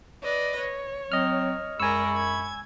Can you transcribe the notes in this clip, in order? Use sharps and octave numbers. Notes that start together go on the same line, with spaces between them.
B4 D5 D#5
C#5
F#3 C4 D#5 F6
F#2 G#3 A#4 D5 G#5 B5 C#6 E6
G#6